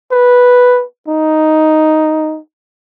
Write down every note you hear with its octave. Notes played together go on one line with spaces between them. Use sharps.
B4
D#4